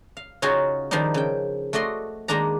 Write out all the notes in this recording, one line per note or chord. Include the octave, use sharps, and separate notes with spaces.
F5
C#3 C#4 D#4 F4 F#4 G#4
D#3 F3 G3 D4 D#4
C#3 G5
A3 F#4 D5 D#5 C6
D#3 G#3 A#3 D4 A#5